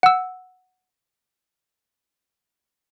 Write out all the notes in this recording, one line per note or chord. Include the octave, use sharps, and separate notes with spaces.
F#5 E6